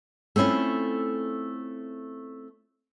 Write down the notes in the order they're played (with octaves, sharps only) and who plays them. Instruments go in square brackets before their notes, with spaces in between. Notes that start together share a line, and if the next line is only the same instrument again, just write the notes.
[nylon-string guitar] A3 C4 C#4 E4 F4